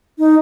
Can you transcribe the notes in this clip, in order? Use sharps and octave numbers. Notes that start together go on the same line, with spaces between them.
D#4